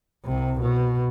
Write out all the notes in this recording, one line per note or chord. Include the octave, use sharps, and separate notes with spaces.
C2 C3
B2